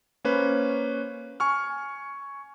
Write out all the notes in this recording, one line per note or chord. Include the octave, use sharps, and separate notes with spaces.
A#3 C#4 B4 C5
G#5 C#6 F6